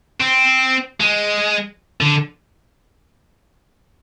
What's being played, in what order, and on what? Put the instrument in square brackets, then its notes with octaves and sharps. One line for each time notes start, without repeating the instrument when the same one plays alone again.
[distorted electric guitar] C4
G#3
D3